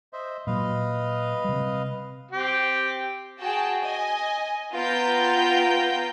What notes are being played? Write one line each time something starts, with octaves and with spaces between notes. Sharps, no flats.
C5 D#5 E5
A#2 F#3 B4 D#5 F5
C3 G3
C4 G4
F#4 G#4 G5 A5
D#5 G#5
B3 F4 G5 A#5 G6